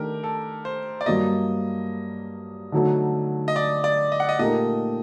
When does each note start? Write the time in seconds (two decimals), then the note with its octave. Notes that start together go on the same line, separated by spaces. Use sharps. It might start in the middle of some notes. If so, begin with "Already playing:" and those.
Already playing: D#3 A3 D4 G4 A#4
0.24 A4
0.65 C5
1.01 D5
1.06 G2 F#3 A#3 D#5
2.72 D3 F#3 A3 D#4 F#4
3.48 D#5
3.56 D5
3.84 D5
4.12 D#5
4.20 F#5
4.29 D#5
4.39 A#2 A3 D#4 G4 A#4 D#5